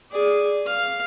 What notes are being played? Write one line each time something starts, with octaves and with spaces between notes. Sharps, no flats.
G#4 D5
F5